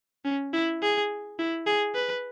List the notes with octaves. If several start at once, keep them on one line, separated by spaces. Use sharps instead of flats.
C#4
E4
G#4
E4
G#4
B4